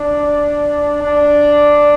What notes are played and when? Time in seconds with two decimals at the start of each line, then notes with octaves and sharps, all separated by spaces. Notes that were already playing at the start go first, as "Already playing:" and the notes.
Already playing: D4
1.01 D4